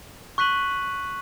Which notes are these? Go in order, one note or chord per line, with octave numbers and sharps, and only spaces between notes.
C#6 F#6 B6 D#7 F#7